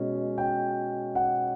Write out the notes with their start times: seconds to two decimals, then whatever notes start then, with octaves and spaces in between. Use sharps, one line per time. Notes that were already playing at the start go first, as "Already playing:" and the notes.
Already playing: B2 G#3 C#4
0.38 G5
1.15 F#5